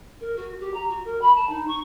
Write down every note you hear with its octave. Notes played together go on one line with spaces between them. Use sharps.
A#4
F#4
G4
A#5
F#4
A#4
B5
A5
D#4
C#6